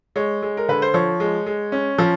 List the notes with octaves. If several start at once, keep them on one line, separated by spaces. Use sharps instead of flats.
G#3 C#5
G#3
A#4
D3 B4
C5
F3 C#5
G#3
G#3
C#4
F3